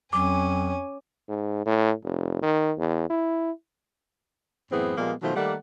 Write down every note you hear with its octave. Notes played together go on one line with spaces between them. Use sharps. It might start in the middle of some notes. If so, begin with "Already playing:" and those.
F2 F#3 C#4 G#5 D6
G#2
A2
F1
D#3
E2
E4
F#2 A2 E3 B3 C4 G#4
A#2 F3 G3 G#3 A#3 B3
B2 D#3 F3 F#3 A3 C5
D#3 G3 A3 A#3 D5 F#5